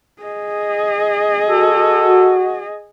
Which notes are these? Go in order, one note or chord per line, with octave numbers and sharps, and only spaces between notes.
G#4 D#5
F#4 A4